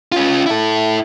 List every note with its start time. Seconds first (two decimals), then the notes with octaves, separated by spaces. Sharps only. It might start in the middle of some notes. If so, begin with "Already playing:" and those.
0.12 C#4 F4
0.46 E4 A4